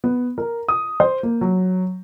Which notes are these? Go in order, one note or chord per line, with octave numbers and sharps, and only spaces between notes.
B3
A#4
D#6
C5
A#3
F#3